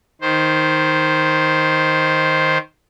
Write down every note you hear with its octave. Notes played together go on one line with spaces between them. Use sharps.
D#3 C5